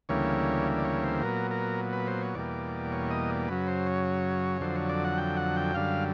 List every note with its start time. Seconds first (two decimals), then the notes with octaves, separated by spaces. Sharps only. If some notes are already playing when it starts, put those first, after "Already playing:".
0.09 D2 C#3 E3 G3 A#3 C#5
0.78 D5
0.84 C#5
1.04 C5
1.22 A#2 F#3 B3 A#4
1.51 A#4
1.93 B4
2.07 C5
2.22 C#5
2.35 E2 B2 G3 A#3 D5
2.92 C#5
3.10 D#5
3.30 D5
3.48 F#2 C#3 F#3 B4
3.68 C5
3.87 C#5
4.61 F2 D3 F#3 C5
4.76 C#5
4.89 D5
5.05 F#5
5.18 G5
5.37 F#5
5.56 G5
5.74 F#2 D3 G3 F5